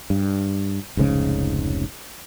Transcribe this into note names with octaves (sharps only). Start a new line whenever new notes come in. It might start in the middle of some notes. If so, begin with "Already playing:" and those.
G2
F1 C#2 G#2 C#3